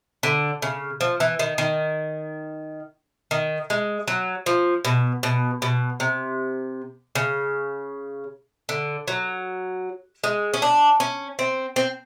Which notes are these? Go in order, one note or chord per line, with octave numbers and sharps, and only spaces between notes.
D3
C#3
F3
E3
D#3
D#3
D#3
G#3
F#3
F3
B2
B2
B2
C3
C#3
D3
F#3
G#3
C#4
D4
C#4
C4
C4